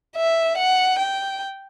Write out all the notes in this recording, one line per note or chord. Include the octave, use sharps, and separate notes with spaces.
E5
F#5
G5